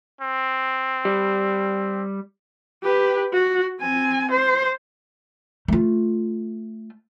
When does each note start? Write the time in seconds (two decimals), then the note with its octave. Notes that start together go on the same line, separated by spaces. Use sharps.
0.21 C4
1.05 G3
2.83 G4 B4
3.33 F#4
3.80 C4 G#5
4.31 C5
5.68 A3 F4